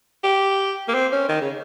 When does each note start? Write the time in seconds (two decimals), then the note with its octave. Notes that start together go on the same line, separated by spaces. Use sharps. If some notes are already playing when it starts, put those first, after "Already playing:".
0.24 G4
0.88 A#3
0.94 C4
1.12 C#4
1.29 D#3
1.41 C#3